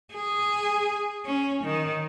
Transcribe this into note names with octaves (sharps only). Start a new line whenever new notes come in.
G#4
C#4
D#3